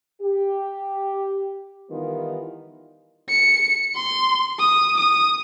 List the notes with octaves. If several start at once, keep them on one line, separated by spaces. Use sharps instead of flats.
G4
D#3 E3 G3 B3 F4
C#7
C6
D#6
D#6